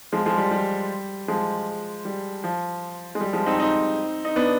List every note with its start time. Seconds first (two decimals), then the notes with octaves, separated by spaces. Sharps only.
0.12 F3 G#3
0.26 F3 G#3
0.38 G3
0.51 G3
1.28 F3 G#3
2.05 G3
2.44 F3
3.15 G#3
3.21 G3
3.33 F3 G#3
3.46 C4 D#4
3.59 C4 D#4
4.25 D#4
4.36 B3 D4